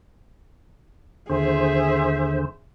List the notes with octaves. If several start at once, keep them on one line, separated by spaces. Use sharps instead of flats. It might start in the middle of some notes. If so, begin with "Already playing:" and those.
D#2 D3 G#4 C5 E5